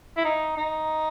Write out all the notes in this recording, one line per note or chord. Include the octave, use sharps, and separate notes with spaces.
E4
D#4
D#4